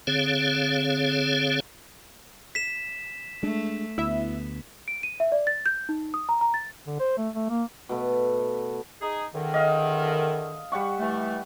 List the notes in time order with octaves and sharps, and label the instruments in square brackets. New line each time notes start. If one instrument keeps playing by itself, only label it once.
[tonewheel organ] D3 C4 G#4 C#5 F5
[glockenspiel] B6 E7
[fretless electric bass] G#3 D4 [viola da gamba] A3
[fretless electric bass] D2 [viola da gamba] B3 [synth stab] E4 E5
[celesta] D7
D#7
E5
D5
A6
G6
D#4
D#6
A#5
A#5
A6
[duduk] D3
C5
A3
A3
A#3
[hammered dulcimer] B2 A3 B3
[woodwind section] D#4 G#4
E2 D3 D#3
[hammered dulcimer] D#5 F5
G3 F#5 C#6
[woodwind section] E3 A3